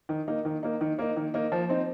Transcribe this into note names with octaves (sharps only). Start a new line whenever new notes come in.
D#3
A#3 D#4
D#3
A#3 D#4
D#3
A#3 D#4
D#3
A#3 D#4
F3
C4 D#4